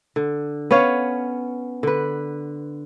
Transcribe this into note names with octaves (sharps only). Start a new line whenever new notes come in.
D3
B3 C#4 C#5 F5
D3 B4